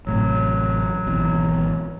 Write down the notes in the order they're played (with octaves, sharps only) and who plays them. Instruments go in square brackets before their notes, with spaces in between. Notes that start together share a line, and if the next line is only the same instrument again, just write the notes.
[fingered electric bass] A1 A2 C3 [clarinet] F#3
[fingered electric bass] G#1 B2 E3